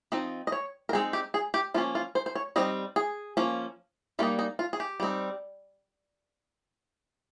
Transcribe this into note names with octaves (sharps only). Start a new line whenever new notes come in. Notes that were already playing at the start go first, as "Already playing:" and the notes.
F3 C4 D#4 D#5
D#5
C#5
A#4
G#3 C4 D#4 G#4
G4
G#4
G4
F3 A#3 C#4 F4
F4
C5
C5
C#5
G3 C4 D#4 D#5
G#4
F3 A#3 C#4
G3 A#3 D#4 F4
D#4
F4
G#4
G4
G3 C4 D#4